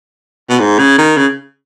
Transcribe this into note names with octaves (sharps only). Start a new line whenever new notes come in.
B2
G#2
C#3
D#3
C#3